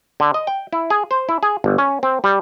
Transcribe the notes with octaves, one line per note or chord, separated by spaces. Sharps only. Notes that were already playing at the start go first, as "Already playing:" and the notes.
D3
D#5
G5
E4
G#4
C5
E4
G#4
G1
C#4
C4
G3